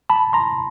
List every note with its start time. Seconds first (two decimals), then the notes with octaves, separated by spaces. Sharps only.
0.10 A5 B5
0.33 A#5 C6